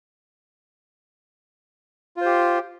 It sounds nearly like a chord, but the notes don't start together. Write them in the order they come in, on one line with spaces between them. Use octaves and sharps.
F4 C5 G4